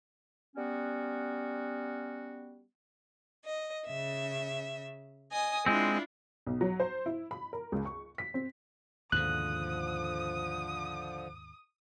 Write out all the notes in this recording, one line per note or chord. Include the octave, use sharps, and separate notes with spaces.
G3 B3 C#4 F#4
D#5
C#3 E5
D#5 G#5 D#6
G#3 C4 D4 E4 F4
B1
F#3
C5
E4
B5
A#4
C#2
C#6
B6
C4
D#2 G#2 B2 D3 F3 D#6 F#6